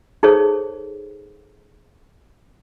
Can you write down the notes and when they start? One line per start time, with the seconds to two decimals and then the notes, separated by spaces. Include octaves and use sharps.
0.23 D#4 G#4 A4 C5 C#5